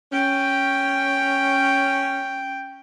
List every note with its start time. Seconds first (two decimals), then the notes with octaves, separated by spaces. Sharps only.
0.12 C#4 G5